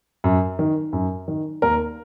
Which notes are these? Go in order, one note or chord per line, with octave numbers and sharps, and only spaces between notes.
F#2
D#3
F#2
D#3
D#2 A#4